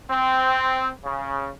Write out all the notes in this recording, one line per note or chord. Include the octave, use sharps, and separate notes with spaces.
C4
C#3